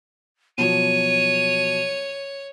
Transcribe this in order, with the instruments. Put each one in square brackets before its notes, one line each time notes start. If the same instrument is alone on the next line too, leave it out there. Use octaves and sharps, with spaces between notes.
[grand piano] B2 F3 F#3 [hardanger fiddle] C#5 [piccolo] D#7